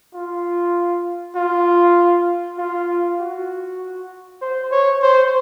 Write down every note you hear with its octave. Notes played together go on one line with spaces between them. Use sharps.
F4
F4
F4
F#4
C5
C#5
C5